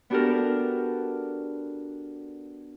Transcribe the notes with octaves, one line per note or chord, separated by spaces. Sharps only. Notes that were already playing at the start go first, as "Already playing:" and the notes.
B3 D4 F#4 G4 A4 A#4